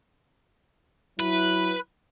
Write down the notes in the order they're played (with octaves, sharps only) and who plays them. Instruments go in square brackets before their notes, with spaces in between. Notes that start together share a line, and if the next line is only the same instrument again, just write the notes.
[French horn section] F#3 E4 [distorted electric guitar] B4